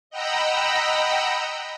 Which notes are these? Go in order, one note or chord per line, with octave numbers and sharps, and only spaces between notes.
D#5 F#5 G5 A#5 B5 E6